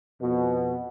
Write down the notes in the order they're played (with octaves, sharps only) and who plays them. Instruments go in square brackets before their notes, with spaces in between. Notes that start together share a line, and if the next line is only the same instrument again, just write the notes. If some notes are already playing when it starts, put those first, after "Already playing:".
[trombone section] F2 B2